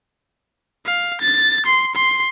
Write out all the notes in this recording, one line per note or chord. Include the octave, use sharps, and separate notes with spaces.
F5
A6
C6
C6